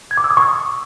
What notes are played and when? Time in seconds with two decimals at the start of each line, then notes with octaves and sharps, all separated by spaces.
0.11 G#6
0.17 D6
0.24 E6
0.31 D#6
0.37 C#6